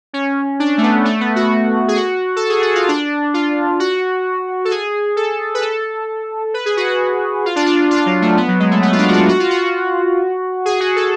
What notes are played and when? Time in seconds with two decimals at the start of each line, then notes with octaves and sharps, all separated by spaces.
0.13 C#4
0.60 D4
0.78 A3
0.82 B3
1.05 A3
1.20 B3
1.36 F#4
1.88 G#4
1.97 F#4
2.36 A4
2.49 G#4
2.62 F#4
2.75 F4
2.88 D4
3.34 F4
3.80 F#4
4.65 A4
4.71 G#4
5.16 A4
5.54 B4
5.62 A4
6.54 B4
6.66 G#4
6.77 F#4
6.88 F#4
7.45 F4
7.56 D4
7.66 F4
7.91 F4
8.06 F#3
8.22 A3
8.37 B3
8.48 F#3
8.60 G#3
8.71 A3
8.82 B3
8.92 F4
8.98 D4
9.08 F#4
9.13 F4
9.29 F#4
9.40 F4
9.50 F#4
10.65 G#4
10.80 F#4
10.96 A4